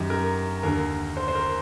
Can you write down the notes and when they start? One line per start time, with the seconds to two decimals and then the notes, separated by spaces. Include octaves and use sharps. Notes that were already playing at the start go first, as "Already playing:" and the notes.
Already playing: F#2 D#3 G4
0.10 A#4
0.63 D#2 D3 A#4
1.17 C5
1.28 C5
1.35 A#4